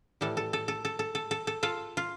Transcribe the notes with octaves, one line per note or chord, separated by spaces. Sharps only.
A2 E3 G3 A4
A4
A4
A4
A4
A4
A4
A4
A4
F4 A4
F4